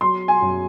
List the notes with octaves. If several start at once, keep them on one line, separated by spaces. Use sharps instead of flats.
F#3 C6
G#5
F#2